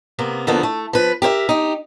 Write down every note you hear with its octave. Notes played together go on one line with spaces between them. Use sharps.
C3 A#3 B3
E2 D3 F3 A#3 B3
A3
F3 B4
G4 A#4 C5 E5
D#4 G4